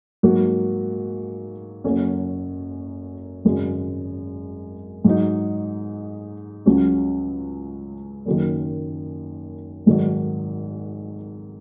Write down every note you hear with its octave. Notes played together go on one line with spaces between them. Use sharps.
G#2 F#3 A#3 F#4
F#1 F#2 F#3 C#4
G#1 F#2 C#3 G#3
G#2 F#3 D#4
C#2 C#3 F#3 C#4
F#1 F#2 D#3
G#1 G#2 D#3 F#3